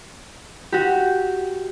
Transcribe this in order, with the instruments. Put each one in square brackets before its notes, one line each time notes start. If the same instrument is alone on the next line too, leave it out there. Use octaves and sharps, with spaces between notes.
[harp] F#4 G4